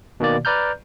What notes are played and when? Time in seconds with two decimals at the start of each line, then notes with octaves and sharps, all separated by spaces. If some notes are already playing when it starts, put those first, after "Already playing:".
0.20 B2 D#3 A#3 D5
0.45 B4 D5 A#5 F6 G6